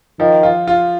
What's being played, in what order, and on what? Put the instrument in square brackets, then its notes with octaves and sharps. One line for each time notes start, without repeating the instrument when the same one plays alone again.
[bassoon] D#3 [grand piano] F3
[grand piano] F4
F4